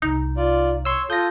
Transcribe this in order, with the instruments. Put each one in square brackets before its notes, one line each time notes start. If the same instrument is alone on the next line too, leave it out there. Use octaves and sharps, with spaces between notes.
[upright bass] C2 [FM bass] D#4
[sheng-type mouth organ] F4 D5
[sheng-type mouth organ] C#5 [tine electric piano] C6 E6
[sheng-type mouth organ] F4 A4 D#6 [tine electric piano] G6 A#6